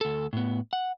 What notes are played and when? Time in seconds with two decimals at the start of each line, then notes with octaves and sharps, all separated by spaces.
0.01 D2 A4
0.33 A2 B3
0.73 F#5